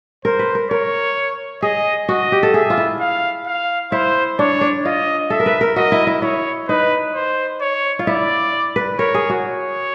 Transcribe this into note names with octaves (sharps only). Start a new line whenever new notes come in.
A#4 C5
B4
A#4
A#4 C#5
G#4 D#5
F#4 D#5
G4
A4
G#4 E5
F4
E4
F5
F5
E4 C5
D4 C#5
D4
F4 D#5
A4 E5
A#4
B4
A#4
F#4 D#5
E4
E4
E4 C#5
D#4 B4
C5
C#5
F4
E4 D5
B4
A#4 C#5
G#4
F#4
C#5